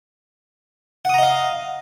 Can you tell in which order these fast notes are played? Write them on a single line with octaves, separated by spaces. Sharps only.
F#5 D#6 A#5 D#5 F5